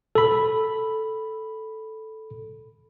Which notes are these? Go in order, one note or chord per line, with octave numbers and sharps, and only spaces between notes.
A4 B5